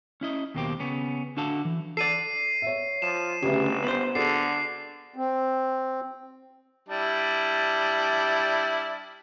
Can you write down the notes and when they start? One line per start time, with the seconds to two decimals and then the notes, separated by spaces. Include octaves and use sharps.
0.21 C#4 E4 D#5
0.55 D#2 B2 A#3 C4 G4
0.80 C#3 B3 C#4
1.37 D3 D4 F#4 A4 F5 A5
1.65 E3
1.97 A4 D5 C7 D#7
2.62 C#5 E5
3.02 F3 E7
3.42 G1 D2 C#3 G4 B4 E5
3.84 B3 C5
4.15 D3 F#4 G#4 A4 C7
5.16 C4
6.89 G3 D4 E4